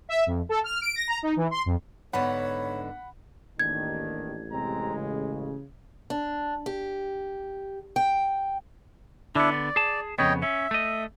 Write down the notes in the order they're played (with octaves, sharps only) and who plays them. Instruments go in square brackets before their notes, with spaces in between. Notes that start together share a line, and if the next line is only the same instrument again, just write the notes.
[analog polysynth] E5
F2
A4
F6
D7
A#6
A#5
D#4
E3
C6
F2
[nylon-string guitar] G#2 D3 B3 [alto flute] C#5 [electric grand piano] F#5 B5
[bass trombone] A1 [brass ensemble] D#2 G#2 D#3 [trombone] D4 [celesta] G#6
[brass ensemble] C3 C4 A#5 [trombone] G#3
[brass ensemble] C#3
[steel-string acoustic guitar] D4
G4
G5
[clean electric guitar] D3 B3 [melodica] D4 E4
[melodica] D5
[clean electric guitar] G#4 A5
[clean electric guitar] F2 C#3 B3 [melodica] C#5 D#5 G5
[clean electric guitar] C#4 [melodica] E5
[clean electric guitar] A3 D#5